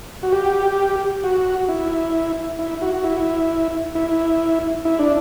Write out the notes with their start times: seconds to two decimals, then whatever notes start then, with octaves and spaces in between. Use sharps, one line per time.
0.23 F#4
0.32 G4
1.24 F#4
1.69 E4
2.59 E4
2.82 F#4
2.94 F#4
3.04 E4
3.95 E4
4.85 E4
4.99 D4